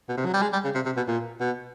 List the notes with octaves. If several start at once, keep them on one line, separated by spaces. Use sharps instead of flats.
B2
C3
F#3
G3
G#3
G3
C#3
C3
C3
B2
A#2
B2